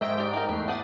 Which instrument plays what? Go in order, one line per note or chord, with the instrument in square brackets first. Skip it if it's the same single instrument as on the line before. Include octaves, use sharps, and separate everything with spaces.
[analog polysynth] G#2 G5 D7 [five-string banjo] D#3 D#5 E5
[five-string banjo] G4 D5
D#4 A#4
[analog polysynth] E2 A3 C7 [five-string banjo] B4
[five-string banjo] D4 F#5 [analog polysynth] D#6 A6